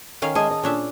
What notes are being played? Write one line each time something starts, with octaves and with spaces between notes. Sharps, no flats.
D#3 C#4 F5
G#3 G#4 D#5 E5 A5 D#6
D#5
A#2 C#4 D4 E5